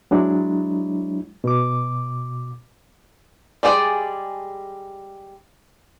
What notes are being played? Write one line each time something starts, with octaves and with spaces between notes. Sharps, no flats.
F#3 G#3 D4 E4
B2 D6
G3 G#3 G#4 D5